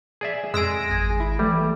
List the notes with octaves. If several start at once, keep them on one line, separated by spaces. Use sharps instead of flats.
G#4 D5 E5
F2 G#3 G#4 E6 A#6 D7
G#1 G#5
E4
E3 G3 A3